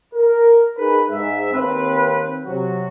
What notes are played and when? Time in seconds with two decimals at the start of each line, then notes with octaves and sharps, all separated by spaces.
0.14 A#4
0.77 D#4 G#4 A#4 B4
1.10 G#2 E5
1.53 D#2 C4 B4
2.46 C3 F#3 F#4